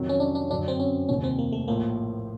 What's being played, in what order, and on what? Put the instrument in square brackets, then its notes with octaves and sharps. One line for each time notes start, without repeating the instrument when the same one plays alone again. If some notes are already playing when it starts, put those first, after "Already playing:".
Already playing: [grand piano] F2 C3 D#3 F#3
[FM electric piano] C#4
D4
D4
[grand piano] F#2 D3 F#3 [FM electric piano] D4
[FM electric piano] C4
C#4
[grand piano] F1 D#2 D#3 [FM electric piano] C#4
[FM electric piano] C4
A#3
A3
[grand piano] A#1 A2 F3 [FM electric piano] A#3